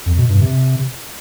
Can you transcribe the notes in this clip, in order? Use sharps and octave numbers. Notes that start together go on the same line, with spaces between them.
F2
B2
G2
C3